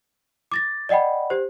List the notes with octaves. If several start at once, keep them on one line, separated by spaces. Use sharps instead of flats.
D6 A6 A#6
D5 D#5 F#5 G5 B5
G4 C5